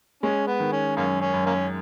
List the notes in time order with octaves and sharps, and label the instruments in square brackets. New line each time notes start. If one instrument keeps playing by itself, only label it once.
[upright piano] G#3 [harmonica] C#4
[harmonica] B3
[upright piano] D#3
[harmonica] C#4
[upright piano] F#2 [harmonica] A#3 C#4
[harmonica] C#4
[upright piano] F#2
[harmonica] A#3 C#4